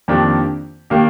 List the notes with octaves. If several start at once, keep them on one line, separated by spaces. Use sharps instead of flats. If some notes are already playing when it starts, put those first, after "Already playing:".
F2 D#3 A#3 D4 G4
D#3 A#3 D4 G4